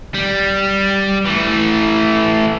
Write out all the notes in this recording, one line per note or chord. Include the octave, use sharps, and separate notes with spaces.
G3
E3 A3